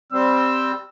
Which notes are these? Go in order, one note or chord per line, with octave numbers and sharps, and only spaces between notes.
G3 C4 E6